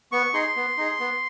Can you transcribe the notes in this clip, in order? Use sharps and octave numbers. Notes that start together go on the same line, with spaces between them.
B3 C#6
D#4 G#4 C6
B3
D#4 G#4
B3